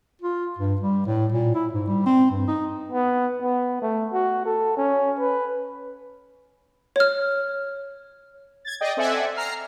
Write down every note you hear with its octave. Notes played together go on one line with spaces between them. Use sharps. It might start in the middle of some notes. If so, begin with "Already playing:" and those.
F4
G2
G3
A2
A#2
E4
G#2
G3
C4
G2
D#4
B3
B3
A3
F#4
A4
C#4
B4
C#5 F6
G#6 A6
G#4 D5 D#5 G5
C4 A4 D5 E5 F#5 G#5
A#5 F6 C7